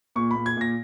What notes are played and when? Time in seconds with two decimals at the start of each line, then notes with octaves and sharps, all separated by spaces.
0.16 A#2 C#6
0.31 A#2 B5
0.46 G#6
0.57 A#2 A#6